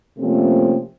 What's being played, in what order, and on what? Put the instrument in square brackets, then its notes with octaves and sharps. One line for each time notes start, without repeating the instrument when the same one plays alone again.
[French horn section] C3 F3 A3 A#3 C4 C#4